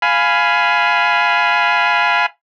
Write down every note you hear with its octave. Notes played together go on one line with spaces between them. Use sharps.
F5 G#5 B5